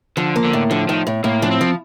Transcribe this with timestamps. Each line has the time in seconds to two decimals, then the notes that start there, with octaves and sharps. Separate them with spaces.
0.17 D3 F3
0.36 A#3
0.44 D3
0.53 A2
0.71 D3 F3
0.89 A2 D#3
1.07 A2
1.24 A2 A#3
1.42 F3 D4
1.51 C4
1.61 F3